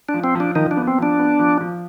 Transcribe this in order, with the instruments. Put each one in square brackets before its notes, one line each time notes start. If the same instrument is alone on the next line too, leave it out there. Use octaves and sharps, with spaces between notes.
[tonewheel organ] D4
[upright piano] F3
[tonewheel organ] C4
[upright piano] F3 [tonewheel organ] D4
[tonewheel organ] D#3 D#4 [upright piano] F3
[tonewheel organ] D4
[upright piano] B3
[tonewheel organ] C4
[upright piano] F3 [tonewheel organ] D4
[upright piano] B3
F3
F3